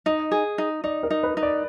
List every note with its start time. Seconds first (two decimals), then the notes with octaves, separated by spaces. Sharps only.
0.06 D#4 D#5
0.31 G#4
0.58 D#4
0.84 D#4 D5
1.03 A#4
1.10 D#4
1.23 B4
1.37 D#4
1.43 D5